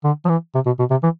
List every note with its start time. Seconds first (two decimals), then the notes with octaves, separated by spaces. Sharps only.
0.04 D3
0.25 F3
0.29 E3
0.54 C3
0.66 B2
0.79 B2
0.90 C3
1.03 E3